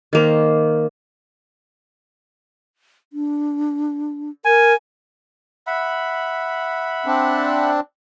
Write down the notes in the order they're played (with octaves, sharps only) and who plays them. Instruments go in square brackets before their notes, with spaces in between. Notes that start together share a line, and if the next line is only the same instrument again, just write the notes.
[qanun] D#3 A#3 C5
[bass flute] D4
[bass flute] A#4 [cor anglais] G#5
[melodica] E5 F#5 B5
[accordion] C4 D4